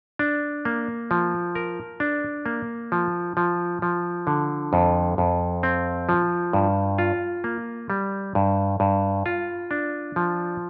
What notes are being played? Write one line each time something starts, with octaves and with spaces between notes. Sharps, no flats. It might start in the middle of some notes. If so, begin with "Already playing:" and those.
D4
A#3
F3
A#4
D4
A#3
F3
F3
F3
D3
F2
F2
C4
F3
G2
F4
A#3
G3
G2
G2
F4
D4
F3